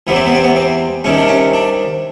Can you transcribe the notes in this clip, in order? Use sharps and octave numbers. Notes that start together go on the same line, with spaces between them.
E2 C3 E3 B3
C4
B3
C4
B3
C4
C2 C3 D#3 C#4
D4
C#4
D4